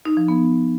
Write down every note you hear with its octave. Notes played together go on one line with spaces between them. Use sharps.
D#4
F3
B3